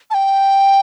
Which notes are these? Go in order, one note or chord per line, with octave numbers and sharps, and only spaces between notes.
A5
G5